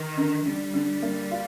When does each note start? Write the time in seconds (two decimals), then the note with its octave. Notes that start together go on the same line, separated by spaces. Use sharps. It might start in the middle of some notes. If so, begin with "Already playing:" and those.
Already playing: D#3
0.17 D3
0.45 D3 G3
0.74 D3
1.03 A#3
1.31 F4